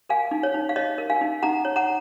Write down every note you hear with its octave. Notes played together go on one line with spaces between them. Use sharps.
A#4 F5 G#5
D#4
C#5 F5
D#4
F5
C#5 D#5
A#4
F5 G#5
D#4
D#4 F#5 A#5
C#5
F#5 A#5